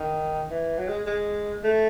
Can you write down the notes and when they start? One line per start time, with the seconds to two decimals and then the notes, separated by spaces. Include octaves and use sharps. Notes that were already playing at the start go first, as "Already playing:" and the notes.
Already playing: D#3
0.50 E3
0.79 F#3
0.88 G#3
1.06 G#3
1.64 A3